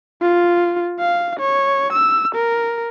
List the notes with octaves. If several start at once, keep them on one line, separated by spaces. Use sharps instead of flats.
F4
F5
C#5
E6
A#4